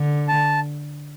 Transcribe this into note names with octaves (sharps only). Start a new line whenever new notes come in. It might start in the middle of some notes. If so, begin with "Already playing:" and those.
Already playing: D3
A5